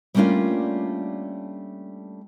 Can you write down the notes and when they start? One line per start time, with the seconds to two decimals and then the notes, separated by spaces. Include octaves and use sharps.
0.14 G3 A3 A#3 C#4 D4 F4